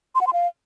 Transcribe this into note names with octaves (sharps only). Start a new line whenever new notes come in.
C6
F#5
C6
F5